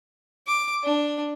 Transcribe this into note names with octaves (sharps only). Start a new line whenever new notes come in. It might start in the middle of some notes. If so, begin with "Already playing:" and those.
D6
D4